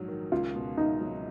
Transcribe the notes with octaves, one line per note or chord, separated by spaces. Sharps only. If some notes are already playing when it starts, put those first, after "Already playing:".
Already playing: A#1 G#2 F#3
D#3
C#2 F4
B2
C#2 D#4
F#3